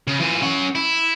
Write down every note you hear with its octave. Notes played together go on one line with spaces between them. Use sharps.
C#3
E3 F4
C#4 F#5
E4